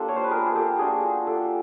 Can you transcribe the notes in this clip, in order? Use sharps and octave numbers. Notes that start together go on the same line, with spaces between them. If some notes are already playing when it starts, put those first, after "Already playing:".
Already playing: A#3 D4 F4 G4 A4
C#5
C5
B4
G#4 A#4
G#4
G4 A4
A#3 D4 F4 F#4 G#4
G4 A4